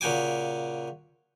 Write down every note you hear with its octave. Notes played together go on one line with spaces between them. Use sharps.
A#2 C#3 F#4 G5 G#5 D6